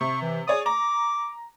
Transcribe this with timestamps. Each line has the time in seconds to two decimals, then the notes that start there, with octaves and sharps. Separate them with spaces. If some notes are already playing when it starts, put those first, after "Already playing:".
0.01 C3 C#6
0.22 E3
0.48 G#4 C#5 D5 D#6
0.66 A#5 D6